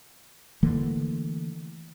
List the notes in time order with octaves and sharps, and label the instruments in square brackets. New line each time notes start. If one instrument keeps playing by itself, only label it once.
[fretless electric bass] D3 E3 A3 A#3